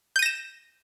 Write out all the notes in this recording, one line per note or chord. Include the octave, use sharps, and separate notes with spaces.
G6 A#6 D#7 E7